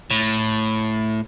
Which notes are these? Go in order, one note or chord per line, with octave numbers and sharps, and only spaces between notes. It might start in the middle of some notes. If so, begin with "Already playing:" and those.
A2